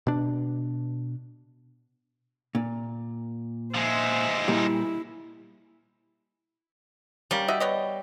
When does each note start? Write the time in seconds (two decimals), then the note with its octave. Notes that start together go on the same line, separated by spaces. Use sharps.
0.07 B2 D4
2.55 A#2
3.74 F3 G#3 C5 E5
4.48 A#2 G3 E4
7.31 G3 A#3 C#4
7.48 F#4 D#5 E5
7.60 B3 C#5 D#5